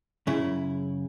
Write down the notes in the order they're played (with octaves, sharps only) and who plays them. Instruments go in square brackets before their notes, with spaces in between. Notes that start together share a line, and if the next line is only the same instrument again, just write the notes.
[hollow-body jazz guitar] F#2 C#3 E4